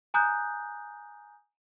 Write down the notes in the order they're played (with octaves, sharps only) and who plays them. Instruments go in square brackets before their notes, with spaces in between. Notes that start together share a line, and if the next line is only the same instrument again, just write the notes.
[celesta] G#5 A#5 D#6 F#6 G6